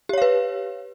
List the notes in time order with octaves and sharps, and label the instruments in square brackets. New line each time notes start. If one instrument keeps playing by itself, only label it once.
[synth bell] G4
C#5
F5
B4